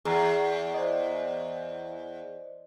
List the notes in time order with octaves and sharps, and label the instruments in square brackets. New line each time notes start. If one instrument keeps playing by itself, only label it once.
[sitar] E2 [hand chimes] G#4 A#5 C7
[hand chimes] C5 D5 D#5